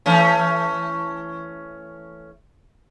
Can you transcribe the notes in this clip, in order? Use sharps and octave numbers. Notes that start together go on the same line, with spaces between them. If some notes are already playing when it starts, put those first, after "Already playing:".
E3 A3 C#4